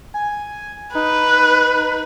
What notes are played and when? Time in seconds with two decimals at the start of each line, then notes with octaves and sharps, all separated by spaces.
0.14 G#5
0.95 D#4 B4